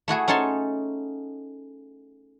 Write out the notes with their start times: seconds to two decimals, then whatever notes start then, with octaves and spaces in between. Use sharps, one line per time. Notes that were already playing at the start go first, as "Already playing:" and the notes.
0.08 A3 E4 F#4 G#4
0.28 C#4 D#4 A4 C#5 A5 C6